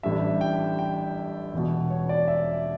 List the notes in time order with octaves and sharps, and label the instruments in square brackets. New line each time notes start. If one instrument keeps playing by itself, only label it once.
[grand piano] A1 A2 G3 D4 E5
G5
G5
E1 E2 B2
C#5
D5
E5